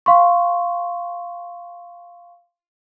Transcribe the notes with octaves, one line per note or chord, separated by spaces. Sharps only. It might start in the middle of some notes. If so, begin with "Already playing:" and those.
F5 C6 C#6